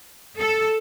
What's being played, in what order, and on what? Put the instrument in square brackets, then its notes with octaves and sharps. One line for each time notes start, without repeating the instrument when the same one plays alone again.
[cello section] A4